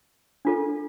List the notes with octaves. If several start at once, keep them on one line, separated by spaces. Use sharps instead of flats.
D4 F4 A4